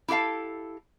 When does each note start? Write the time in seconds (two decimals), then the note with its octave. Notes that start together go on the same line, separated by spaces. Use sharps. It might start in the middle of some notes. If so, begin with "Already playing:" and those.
0.08 E4 G4 A4 F5 A5